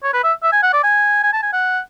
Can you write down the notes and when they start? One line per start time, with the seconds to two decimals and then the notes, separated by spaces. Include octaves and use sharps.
0.03 C#5
0.13 B4
0.24 E5
0.43 E5
0.53 G#5
0.63 F#5
0.73 D5
0.83 G#5
1.23 G#5
1.33 A5
1.43 G#5
1.53 F#5